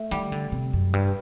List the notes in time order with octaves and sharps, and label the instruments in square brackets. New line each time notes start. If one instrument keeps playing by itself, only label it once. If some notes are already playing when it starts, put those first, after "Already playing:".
Already playing: [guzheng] A3
[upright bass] D#3 [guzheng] G3
[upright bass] D3
C3
F#2
G2